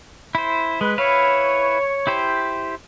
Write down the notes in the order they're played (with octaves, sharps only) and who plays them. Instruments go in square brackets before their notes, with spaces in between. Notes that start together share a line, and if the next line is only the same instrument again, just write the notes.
[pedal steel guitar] E4 C5
[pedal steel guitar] G#3 [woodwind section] B4
[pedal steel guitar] E4 B4 F5 [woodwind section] C#5
[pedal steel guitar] E4 G4 C5